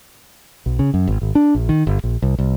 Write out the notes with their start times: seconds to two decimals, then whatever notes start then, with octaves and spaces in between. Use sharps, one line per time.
0.66 B1
0.79 C#3
0.94 F#2
1.07 G#1
1.22 G#1
1.35 D4
1.55 A#1
1.69 D#3
1.87 G1
2.04 A#1
2.22 C2
2.38 C2